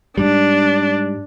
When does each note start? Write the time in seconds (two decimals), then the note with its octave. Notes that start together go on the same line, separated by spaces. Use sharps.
0.18 G#2 G3 D4